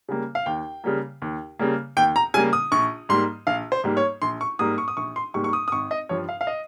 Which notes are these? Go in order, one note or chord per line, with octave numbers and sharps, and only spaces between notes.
C#3 G3 A#3
F5
D#2 G5
C#3 G3 A#3
D#2
C#3 G3 A#3
D#2 G5
A#5
C#3 G3 A#3 G#5
D#6
A#1 C#6
G#2 G3 A#3 C6
A#1 F5
C5
G#2 G3 A#3
C#5
A#1 C6
C#6
G#2 G3 A#3 D#6
C#6
D#6
A#1 C#6
C6
G#2 G3 A#3 C#6
C#6
D#6
D#6
G#1 C#6
D#5
G2 F3 C#5
F5
F5
D#5